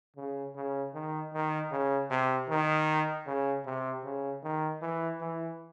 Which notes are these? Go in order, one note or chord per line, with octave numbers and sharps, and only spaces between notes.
C#3
C#3
D#3
D#3
C#3
C3
D#3
C#3
C3
C#3
D#3
E3
E3